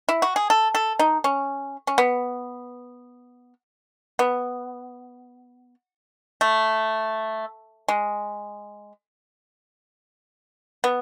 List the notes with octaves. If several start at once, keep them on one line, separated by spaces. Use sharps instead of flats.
E4
F#4
G#4
A4
A4
D#4
C#4
C#4
B3
B3
A3
G#3
B3